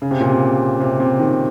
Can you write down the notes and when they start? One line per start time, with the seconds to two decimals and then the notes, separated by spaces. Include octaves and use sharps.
0.02 C#3
0.11 C3
0.20 A#2
0.29 C3
0.80 C3
1.00 C3
1.19 D#3